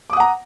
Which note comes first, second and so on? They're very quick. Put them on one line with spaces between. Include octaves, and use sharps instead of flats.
D6 D#6 F#5 A#5